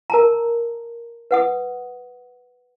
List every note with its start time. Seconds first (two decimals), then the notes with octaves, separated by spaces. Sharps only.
0.10 A#4 A5 A#5
1.31 B4 F#5 D#6